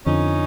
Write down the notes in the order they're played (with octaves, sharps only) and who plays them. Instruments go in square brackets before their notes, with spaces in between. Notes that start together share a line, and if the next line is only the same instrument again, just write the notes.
[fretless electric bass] F2 D3 F3 [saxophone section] C#4 D#4